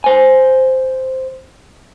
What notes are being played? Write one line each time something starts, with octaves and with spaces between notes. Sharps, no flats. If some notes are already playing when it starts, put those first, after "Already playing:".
C5 G#5